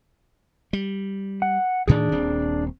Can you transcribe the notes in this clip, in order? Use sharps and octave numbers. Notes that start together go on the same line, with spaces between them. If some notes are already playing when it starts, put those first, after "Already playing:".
G3
F#5
D2 A2 D#3 D4 G#4
D#1 C4